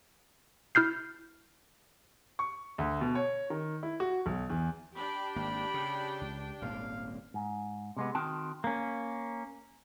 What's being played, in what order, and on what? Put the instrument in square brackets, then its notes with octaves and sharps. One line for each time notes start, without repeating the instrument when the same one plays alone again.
[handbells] E4 F6 G6 C7
[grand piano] C#6
D2
B2
C#5
D#3
E4
F#4
B1
E2
[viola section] D4 G4 G5 [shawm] B5
[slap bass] G#1 A#3 [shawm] B5
[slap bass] C#3
C#2
[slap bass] D#1 G#1 A#3 [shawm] F5
[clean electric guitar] G#2
C3 G#3 B3
D#3 C4 F#4 G5 A5
[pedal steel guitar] A#3 C#4